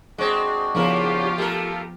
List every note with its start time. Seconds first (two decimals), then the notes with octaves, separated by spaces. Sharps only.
0.18 G#3 C4 D4 F#4
0.75 C#3 F3 B3 E4 F4 G4 A#4
1.38 A3 A4 A#4 F5